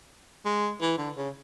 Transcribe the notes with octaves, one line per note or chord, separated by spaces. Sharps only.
G#3
E3
D3
C#3